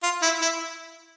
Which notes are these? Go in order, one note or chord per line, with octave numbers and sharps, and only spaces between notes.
F4
E4
E4